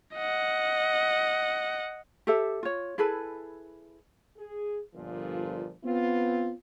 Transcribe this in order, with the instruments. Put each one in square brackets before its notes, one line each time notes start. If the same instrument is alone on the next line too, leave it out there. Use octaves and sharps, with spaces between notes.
[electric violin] D#5 F#5
[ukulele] G4 A4 E5
F4 C#5
E4 G#4 A4 B4
[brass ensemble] G#4
G1 A#2 F3
B3 C4 F4